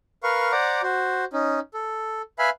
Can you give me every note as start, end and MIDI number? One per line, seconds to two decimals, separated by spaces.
0.23 0.52 70
0.23 0.52 71
0.23 0.52 77
0.23 0.52 85
0.52 0.81 72
0.52 0.81 74
0.52 0.81 78
0.52 0.81 82
0.52 0.81 86
0.83 1.25 66
0.83 1.25 72
1.33 1.60 61
1.33 1.60 63
1.74 2.22 69
2.39 2.50 71
2.39 2.50 76
2.39 2.50 77
2.39 2.50 80
2.39 2.50 83